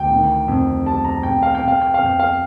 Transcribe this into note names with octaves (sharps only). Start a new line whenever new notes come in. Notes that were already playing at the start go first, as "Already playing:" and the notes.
Already playing: D2 G5
D#3
F2
G3 A5
A#5
F2 G5
F5
G5
C3
F5
G5
F2 F5
G5
F5